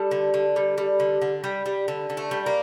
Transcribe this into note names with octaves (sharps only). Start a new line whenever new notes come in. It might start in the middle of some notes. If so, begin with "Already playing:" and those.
Already playing: G3 A4
D3
D3
G3
G3
D3
D3
G3
G3
D3
D3
A3
G3
A#3